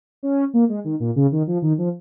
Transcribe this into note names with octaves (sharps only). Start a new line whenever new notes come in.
C#4
A#3
G#3
D#3
A#2
C#3
D#3
F3
D#3
F3